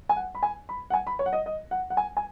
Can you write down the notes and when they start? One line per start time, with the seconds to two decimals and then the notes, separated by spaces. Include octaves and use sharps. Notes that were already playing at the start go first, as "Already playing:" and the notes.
0.09 G#5
0.17 F#5
0.35 B5
0.43 G#5
0.69 B5
0.90 F#5
0.94 G#5
1.07 B5
1.19 C#5
1.26 F#5
1.33 D#5
1.46 D#5
1.71 F#5
1.90 F#5
1.97 G#5
2.17 G#5